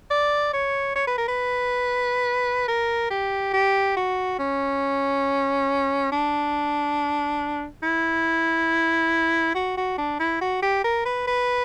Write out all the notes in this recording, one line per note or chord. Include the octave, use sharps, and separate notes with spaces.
D5
C#5
C#5
B4
A#4
B4
A#4
G4
G4
F#4
C#4
D4
E4
F#4
F#4
D4
E4
F#4
G4
A#4
B4
B4